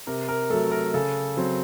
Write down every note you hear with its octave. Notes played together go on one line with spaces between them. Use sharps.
C3 A#4
A#4
F#3 A3 A4
A#4
C#3 A4
F#3 C4